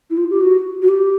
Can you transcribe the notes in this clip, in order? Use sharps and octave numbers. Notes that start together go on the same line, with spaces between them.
E4
F4
G4
F#4
F#4
G4